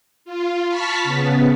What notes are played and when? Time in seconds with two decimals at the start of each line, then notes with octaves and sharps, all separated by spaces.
0.25 F4
0.69 A5 B5 C#6 F6 A6 B6
1.04 C#3 B3